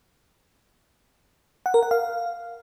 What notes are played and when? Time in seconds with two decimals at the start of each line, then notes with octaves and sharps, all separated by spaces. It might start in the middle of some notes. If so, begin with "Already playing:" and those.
1.66 F#5
1.74 A#4
1.83 F#5
1.91 F5